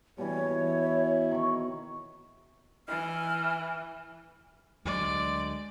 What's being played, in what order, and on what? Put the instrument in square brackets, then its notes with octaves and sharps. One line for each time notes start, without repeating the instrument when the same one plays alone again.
[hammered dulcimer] B2 E3 [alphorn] G3 [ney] C#5
[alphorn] E4
[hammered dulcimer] D#3 C#6
[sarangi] E3 [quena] F6
[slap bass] D2 F#3 [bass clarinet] G#3 [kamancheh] D5